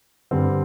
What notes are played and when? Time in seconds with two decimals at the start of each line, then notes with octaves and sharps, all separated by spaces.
0.31 G2 D3 G3 C4